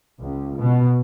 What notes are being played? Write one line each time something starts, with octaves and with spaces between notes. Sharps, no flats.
C#2
B2